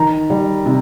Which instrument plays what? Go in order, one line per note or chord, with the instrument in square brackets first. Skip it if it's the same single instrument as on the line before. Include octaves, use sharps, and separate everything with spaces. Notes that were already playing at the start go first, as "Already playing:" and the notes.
Already playing: [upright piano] D#3 A#5
G3
C3